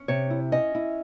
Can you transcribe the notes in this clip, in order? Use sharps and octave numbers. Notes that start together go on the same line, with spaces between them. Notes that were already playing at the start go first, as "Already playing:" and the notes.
Already playing: C#4
C3 C#5
E4
C#4 D#5
E4